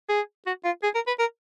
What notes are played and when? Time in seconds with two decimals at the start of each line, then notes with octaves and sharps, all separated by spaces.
0.09 G#4
0.47 F#4
0.65 F4
0.83 G#4
0.95 A#4
1.07 B4
1.19 A#4